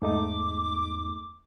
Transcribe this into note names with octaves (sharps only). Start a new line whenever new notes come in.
E2 G#2 A3 D#4 D6